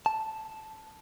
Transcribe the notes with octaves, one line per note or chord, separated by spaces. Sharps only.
A5